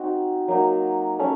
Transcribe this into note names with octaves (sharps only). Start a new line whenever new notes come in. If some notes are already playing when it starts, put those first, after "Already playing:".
Already playing: C4 D#4 F#4
F#3 A#3 D#4
A3 C#4